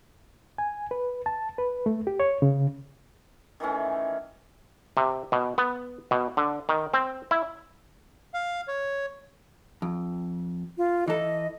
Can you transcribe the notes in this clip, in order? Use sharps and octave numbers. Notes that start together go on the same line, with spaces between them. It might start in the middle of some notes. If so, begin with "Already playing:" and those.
G#5
B4
A5
B4
A3
G4
C#5
C#3
D#3 E3 A3 C#4
C3
B2
B3
B2
D3
D#3
C4
E4
F5
C#5
F2
F4
E3 A4 D#5